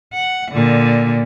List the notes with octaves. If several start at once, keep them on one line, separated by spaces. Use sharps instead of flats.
F#5
A#2 D3